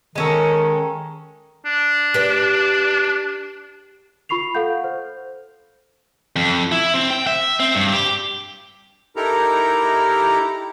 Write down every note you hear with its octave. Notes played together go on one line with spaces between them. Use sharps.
D#3 G#3 C#4 A4
D4
G4 B4 D5
F4 B5 C#6 C7 F7
A4 F5 F#5 G6
C5
F2
E4
C4
G5
E5
C4
G2
G4
D#4 E4 G4 A4 A#4 A#5